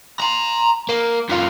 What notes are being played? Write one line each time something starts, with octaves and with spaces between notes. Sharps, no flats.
A#5 C6
A#3
F#2 F4